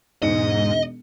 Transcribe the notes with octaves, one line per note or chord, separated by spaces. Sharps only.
E1 G#2 D#4 D#5 C#7